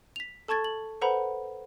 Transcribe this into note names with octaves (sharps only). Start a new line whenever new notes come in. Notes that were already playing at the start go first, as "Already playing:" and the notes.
B6 F7
A4 A5 C#6 G#6 A6
F#7
A4 B4 C5 F#5 A#5 B5